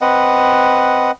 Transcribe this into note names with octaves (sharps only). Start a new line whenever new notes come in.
C4 B4 D#5 F#5